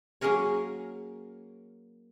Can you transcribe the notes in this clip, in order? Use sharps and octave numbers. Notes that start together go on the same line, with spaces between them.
F#3 A#3 C#4 G#4 A#4 C#5